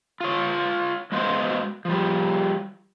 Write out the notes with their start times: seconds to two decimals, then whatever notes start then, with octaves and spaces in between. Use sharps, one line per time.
0.21 F4 C#5
1.12 G#3 B3 F#4 C5 F5
1.85 F3 G3